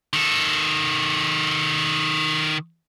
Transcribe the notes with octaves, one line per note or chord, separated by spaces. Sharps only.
D#3 A4